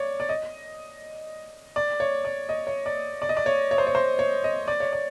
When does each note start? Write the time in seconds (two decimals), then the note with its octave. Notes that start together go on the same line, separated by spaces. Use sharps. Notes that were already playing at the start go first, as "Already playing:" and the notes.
Already playing: C#5 D5
0.20 D5
0.29 D#5
1.76 D5
2.00 C#5
2.25 D5
2.49 D#5
2.67 C#5
2.86 D5
3.22 D5
3.29 D#5
3.37 D5
3.46 C#5
3.71 C#5
3.78 C5
3.87 C#5
3.95 C5
4.19 C#5
4.44 D#5
4.68 D5
4.80 C#5
4.93 D5